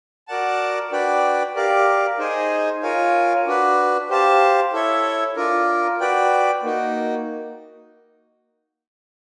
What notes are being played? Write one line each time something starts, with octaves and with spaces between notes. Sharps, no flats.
F#4 A#4 D5 F#5 A5
D4 F#4 B4 D5 G5
G4 A#4 D5 F5
D#4 G#4 C5 D#5 G#5
F4 A#4 C#5 F5 G#5
D4 F#4 B4
G4 C5 F5 A5
E4 A4 C#5 E5
D4 F4 A#4
F#4 B4 D5 G5
A#3 D#4 F#4